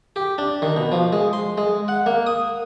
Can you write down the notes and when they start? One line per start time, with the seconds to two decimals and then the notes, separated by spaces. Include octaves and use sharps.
0.16 G4
0.38 D4
0.62 D#3
0.77 B2
0.92 F3
1.13 G#3
1.33 C6
1.58 G#3
1.88 F#5
2.06 A#3
2.27 D#6